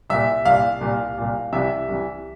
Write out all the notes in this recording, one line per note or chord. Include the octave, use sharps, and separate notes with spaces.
C2 A#2 E5
C2 A#2 F5
C2 A#2
C2 A#2
C2 C3 E3 E5
C2 C3 E3